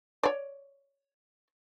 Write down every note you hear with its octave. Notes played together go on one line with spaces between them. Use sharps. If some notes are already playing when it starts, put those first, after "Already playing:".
C#5 D5